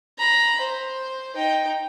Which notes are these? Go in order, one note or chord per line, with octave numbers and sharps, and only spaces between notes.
A#5 B5
C5
D#4 G5